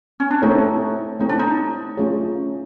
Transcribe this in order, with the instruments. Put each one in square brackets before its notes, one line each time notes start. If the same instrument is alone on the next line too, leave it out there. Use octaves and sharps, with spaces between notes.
[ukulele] C#4
D4
[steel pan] A3 C4 E4 A4 C#5 [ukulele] D#4
[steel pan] A3 C4 E4 A4 C#5 [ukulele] D#4
[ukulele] D4
D#4
[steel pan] A3 C#4 F4 G#4 C#5